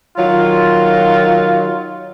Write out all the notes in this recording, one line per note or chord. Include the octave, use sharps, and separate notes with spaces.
D#3 F#3 F4